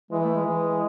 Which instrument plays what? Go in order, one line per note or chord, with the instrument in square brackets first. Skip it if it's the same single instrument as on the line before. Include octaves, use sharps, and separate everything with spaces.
[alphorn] E3 [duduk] G#3
[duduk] A3
G#3
[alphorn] E3